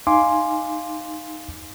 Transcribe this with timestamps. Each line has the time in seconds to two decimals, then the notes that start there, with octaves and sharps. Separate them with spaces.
0.07 D#4 F5 G#5 C6 D6